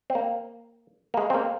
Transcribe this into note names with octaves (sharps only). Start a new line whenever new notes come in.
C4
A#3
A#3
G#3
C4
A#3